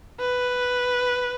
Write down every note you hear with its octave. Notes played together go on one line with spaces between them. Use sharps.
B4